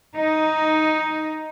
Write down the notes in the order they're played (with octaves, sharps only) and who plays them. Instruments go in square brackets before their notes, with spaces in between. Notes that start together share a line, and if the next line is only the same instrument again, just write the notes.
[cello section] D#4